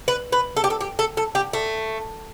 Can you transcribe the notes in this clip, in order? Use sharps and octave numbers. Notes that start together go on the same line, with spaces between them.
B4
B4
A4
G4
A4
G4
A4
A4
G4
A3